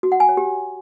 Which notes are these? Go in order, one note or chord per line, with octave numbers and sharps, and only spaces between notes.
F#4
F#5
G#5
C#5
G4